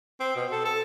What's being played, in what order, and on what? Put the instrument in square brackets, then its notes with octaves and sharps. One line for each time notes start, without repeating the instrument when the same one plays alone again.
[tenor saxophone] C4
B2
A4
A4